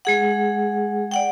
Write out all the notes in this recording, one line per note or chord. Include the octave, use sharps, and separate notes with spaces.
G#3 G#4 F#5
D5 F#5 G5